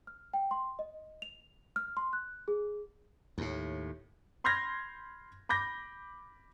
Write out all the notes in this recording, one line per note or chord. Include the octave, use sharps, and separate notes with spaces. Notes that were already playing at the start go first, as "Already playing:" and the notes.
F6
G5
C6
D#5
F7
F6
C6
F#6
G#4
D#2 A2
B5 C6 F6 G6 G#6 A#6
B5 D6 G6 A#6